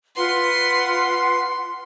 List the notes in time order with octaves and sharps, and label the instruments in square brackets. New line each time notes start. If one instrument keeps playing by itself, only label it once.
[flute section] F4 B4 F#5 [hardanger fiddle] C6